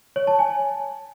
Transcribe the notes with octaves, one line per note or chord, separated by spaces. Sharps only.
C#5
A5
G#5